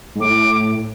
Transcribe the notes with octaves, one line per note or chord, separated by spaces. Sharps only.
G#2
A2 D6